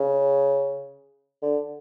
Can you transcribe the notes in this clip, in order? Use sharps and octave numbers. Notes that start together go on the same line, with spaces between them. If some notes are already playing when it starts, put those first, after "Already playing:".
Already playing: C#3
D3